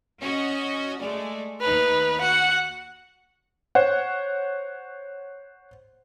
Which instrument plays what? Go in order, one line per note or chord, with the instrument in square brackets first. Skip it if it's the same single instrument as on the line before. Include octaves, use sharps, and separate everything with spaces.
[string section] C#4 F#4 D#5
G#3 A3 D5
[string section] D#2 D#4 F6 [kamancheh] B4
[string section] F#4 [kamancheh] F#5
[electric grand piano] C5 C#5 F#5